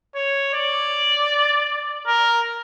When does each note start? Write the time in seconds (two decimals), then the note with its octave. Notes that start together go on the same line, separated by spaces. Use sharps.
0.15 C#5
0.53 D5
2.07 A#4